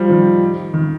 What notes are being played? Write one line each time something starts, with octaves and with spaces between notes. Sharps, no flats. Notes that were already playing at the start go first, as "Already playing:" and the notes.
Already playing: F3 G3
D#3
D#3